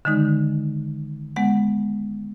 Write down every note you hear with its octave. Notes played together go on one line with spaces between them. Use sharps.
D3 D#3 G#3 D#4
G#3 B3 F#5